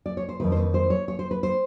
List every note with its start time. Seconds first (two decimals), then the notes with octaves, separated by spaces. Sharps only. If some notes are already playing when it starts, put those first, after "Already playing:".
0.06 D5
0.17 C#5
0.29 C5
0.40 F2 C3 D#3 B4
0.52 C5
0.57 B4
0.74 C5
0.90 C#5
1.08 C#5
1.19 C5
1.31 B4
1.43 C5